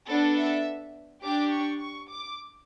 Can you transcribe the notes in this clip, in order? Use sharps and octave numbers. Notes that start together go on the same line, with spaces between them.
B3 D4 A4
E5
D4 G4 D6
C#6
C#6
D6